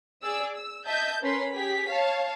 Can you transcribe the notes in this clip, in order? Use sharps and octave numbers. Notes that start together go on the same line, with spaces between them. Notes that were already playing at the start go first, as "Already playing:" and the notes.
G#4 D5 E6
E6
D#5 E5 A5 G6
C#4 A#4 B4 B5 C6
G4 G#4 B6
C#5 F5 A5